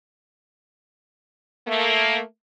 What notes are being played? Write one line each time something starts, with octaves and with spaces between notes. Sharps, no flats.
A3 A#3